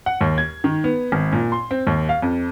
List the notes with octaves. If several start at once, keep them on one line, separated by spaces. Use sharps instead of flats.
F#5
D#2
G#6
D#3
B3
G#1
A#2
C6
C4
D#2
F5
F2